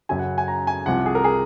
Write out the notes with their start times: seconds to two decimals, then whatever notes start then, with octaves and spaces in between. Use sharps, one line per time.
0.09 F#2 C#3 F#3 G#5
0.19 F#5
0.38 G#5
0.48 A#5
0.67 G#5
0.86 C2 C3 F3 F#5
1.06 G#4
1.15 A#4
1.24 G#4